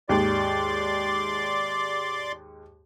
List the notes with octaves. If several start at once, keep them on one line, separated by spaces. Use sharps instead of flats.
D#2 G#2 D5 C6 D6